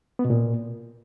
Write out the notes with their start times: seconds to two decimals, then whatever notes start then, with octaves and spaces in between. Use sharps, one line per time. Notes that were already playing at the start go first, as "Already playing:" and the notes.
0.19 B3
0.25 B2
0.30 A#2